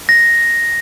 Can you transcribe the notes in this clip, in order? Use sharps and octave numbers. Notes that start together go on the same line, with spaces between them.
A#6